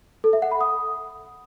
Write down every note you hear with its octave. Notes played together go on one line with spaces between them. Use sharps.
A4
E5
F#5
B5
D#6